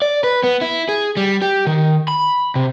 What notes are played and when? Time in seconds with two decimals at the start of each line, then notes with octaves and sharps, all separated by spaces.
0.02 D5
0.24 B4
0.44 B3
0.61 E4
0.89 G#4
1.17 G3
1.42 G4
1.67 D#3
2.08 B5
2.55 C3